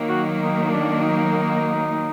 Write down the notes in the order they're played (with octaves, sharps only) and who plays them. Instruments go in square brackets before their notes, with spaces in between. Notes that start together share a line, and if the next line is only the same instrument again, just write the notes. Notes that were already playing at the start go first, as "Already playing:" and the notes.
Already playing: [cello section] D#3 F#3 A#3
[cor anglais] F#4
D#4
D4
D#4